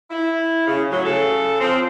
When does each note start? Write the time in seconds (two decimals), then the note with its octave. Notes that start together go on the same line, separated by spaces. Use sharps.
0.11 E4
0.67 C#3
0.91 A2 F#3
1.05 C#3 A4
1.60 F3 C4